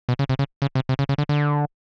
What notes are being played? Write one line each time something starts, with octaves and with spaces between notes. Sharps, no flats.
B2
C#3
C3
C#3
C#3
C3
C3
C#3
C#3
D3
D3